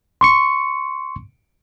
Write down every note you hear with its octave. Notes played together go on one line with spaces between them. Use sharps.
C6 C#6 C#7